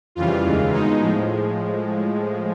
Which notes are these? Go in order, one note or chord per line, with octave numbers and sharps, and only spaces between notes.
F2 C#3 E3 G3 F4
D#2 C#3 E3 G#3
B2 G#3 D#4
A2 F3 G#3